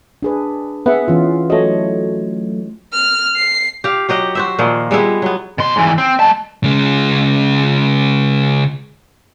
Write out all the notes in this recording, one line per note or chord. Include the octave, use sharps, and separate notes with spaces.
D4 G#4 B4
B3 G#4 E5 F#5
E3 C#4 F4
F#3 A3 C#5 D#5
F6
C7
G4 F5
F#3 G4 D#5 F#5
F#4 C5 E5
A#2 D#3 F3
G3 G#3 B3 E4
F#3 B3
B2 C6
G#2 E3
C4
G#3 A5
C#3 G#3